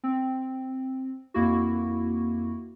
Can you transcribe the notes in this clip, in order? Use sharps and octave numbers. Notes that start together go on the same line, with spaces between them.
C4
F2 A#3 E4 F#4